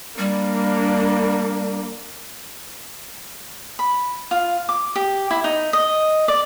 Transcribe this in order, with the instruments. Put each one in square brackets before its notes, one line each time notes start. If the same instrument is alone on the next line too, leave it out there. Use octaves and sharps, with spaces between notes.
[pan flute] G3 [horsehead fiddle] A#3 D4
[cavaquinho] B5
F4
D6
G4
E4
D#4
D#5
D5